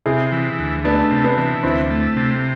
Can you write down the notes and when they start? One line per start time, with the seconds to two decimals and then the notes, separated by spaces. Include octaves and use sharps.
0.06 C3 E4 G#4
0.32 E3
0.59 D2
0.84 A3 B3 D4
1.11 C3
1.24 B3 D4
1.38 E3
1.63 D2 C4 E4
1.90 A3
2.16 C3